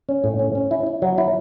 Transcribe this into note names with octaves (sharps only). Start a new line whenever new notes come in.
C#4
A2
C#4
C#4
E4
E4
F#3
E4